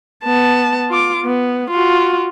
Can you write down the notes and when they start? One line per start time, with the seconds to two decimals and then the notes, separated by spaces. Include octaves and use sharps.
0.24 B3 A5
0.89 F4 D6
1.25 B3
1.70 F4 F#4